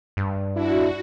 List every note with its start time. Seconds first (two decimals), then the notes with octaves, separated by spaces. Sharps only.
0.17 G2
0.55 D4 E4 F#4